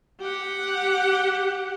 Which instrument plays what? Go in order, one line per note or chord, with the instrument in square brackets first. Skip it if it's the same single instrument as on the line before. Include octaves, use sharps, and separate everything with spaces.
[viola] G4 F#5